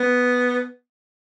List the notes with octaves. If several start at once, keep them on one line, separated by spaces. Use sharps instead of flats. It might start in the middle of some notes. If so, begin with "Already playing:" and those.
Already playing: B3